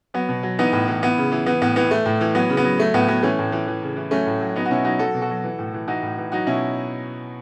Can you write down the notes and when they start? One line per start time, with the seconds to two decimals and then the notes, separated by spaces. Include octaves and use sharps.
0.14 F#3 B3
0.29 B2
0.43 F#3
0.59 E3 B3 D#4
0.73 A2
0.88 E3
1.02 E3 B3
1.18 C#3
1.32 E3
1.46 E3 B3
1.62 A2 B3
1.76 E3 B3
1.91 E3 A3
2.06 A2
2.21 E3
2.35 F#3 B3
2.50 C#3
2.57 B3
2.65 F#3
2.79 F#3 A3
2.94 A2 B3
3.08 F#3 B3
3.23 E3 A3 C#4
3.39 A2
3.52 E3
3.67 E3
3.82 C#3
3.96 E3
4.11 F#3 A3 C#4
4.26 A2
4.41 F#3
4.56 F#3 B3 D#4
4.65 F#4
4.70 B2 C#4 E4
4.85 F#3 D#4 F#4
4.99 F#3 F#4 A4
5.14 B2
5.21 F#4 A4
5.30 F#3
5.44 E3
5.59 A2
5.74 E3
5.88 E3 D#4 F#4
6.03 A2
6.18 E3
6.32 F#3 D#4 F#4
6.47 B2 C#4 E4